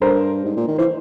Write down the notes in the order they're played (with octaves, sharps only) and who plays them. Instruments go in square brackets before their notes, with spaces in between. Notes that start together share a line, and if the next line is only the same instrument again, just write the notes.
[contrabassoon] G2 [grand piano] A#4 C5
[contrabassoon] G#2
A#2
D#3
[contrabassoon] E3 [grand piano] C5